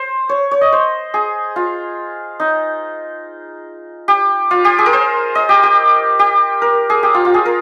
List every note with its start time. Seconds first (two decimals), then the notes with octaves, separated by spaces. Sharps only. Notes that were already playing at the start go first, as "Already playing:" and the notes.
Already playing: C5
0.29 C#5
0.51 C#5
0.61 D#5
0.72 C5
1.14 G#4
1.56 F4
2.40 D#4
4.08 G4
4.51 F4
4.65 G4
4.79 G#4
4.86 A#4
4.93 C5
5.35 D#5
5.49 G4
5.63 G4
6.19 G4
6.62 A#4
6.90 G#4
7.03 G4
7.14 F4
7.25 F4
7.34 G#4
7.46 A#4